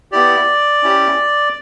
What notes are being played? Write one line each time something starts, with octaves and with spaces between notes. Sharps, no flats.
B3 E4 G4 D5
C#4 E4 G4